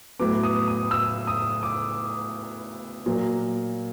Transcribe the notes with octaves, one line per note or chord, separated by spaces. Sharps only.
A2 F#3 B3 D6
D#6
D#6
E6
D#6
D6
A#2 F#3 A#3